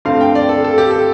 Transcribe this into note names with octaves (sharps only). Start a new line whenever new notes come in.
G2 D3 A3 C4 F5
G5
D5
A4
A4
G4
A4